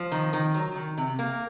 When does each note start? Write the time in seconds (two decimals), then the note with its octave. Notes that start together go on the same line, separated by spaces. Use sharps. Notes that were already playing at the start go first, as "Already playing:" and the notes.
Already playing: F3
0.12 D#3
0.33 D#3
0.54 F#3
0.76 D#3
0.98 C3
1.19 A#3